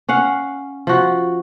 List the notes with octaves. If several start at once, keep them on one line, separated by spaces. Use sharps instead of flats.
C#4 F5 F#5
F3 F#4